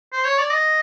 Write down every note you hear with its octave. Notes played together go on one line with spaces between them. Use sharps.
C5
C#5
D5
D#5